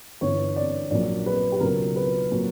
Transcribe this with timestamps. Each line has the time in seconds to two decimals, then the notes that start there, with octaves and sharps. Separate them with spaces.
0.21 G1 G2 E3 C#5
0.56 D5
0.91 A#1 A#2 F#3 D5
1.26 B4
1.52 G4
1.60 C#2 B2 F#3 A#4
1.96 B4
2.31 A#2 F#3